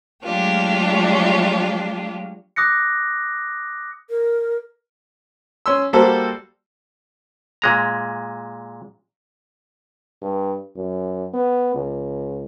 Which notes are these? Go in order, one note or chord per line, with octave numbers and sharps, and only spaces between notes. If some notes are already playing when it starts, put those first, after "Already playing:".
F#3 G#3 A3 D4 F4 G4
D6 D#6 F#6 A#6 C#7
A#4
C#4 C6 E6
G3 A#3 F#4 A4 C5
A#2 G#3 A#5
G2
F#2
B3
C#2